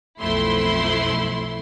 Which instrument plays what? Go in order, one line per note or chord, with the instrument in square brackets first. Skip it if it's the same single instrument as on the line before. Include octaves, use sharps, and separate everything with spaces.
[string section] B1 F2 A3 E4 C6